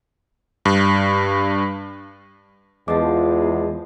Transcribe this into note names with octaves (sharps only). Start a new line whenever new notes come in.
G2
E2 F3 G#3 C5 D#5 A5 D6